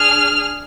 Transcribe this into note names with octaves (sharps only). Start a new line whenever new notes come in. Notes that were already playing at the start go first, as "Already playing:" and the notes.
Already playing: D4 G#4 F6